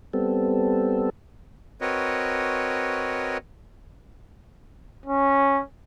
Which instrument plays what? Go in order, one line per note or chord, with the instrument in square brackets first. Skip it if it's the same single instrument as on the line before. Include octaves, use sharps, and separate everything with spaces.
[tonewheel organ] G3 B3 C4 A4
[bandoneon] C4 F#4 A#4 B4 C#5 D#5
[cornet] C#4